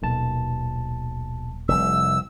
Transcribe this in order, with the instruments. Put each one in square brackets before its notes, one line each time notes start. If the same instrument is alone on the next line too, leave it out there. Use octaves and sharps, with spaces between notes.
[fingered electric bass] D#1 A#2 [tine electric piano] B1 A5
[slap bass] F1 C2 [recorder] E6